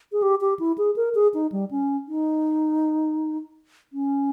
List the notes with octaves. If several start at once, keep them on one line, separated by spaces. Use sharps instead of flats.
G#4
G4
G4
E4
G#4
A#4
G#4
D#4
G3
C#4
D#4
C#4